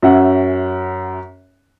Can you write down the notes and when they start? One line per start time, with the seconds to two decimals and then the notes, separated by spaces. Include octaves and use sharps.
0.03 F#2 C#4 E5 F#5